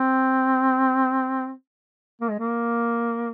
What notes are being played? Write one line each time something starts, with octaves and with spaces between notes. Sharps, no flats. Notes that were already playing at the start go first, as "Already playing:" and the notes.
Already playing: C4
A#3
G#3
A#3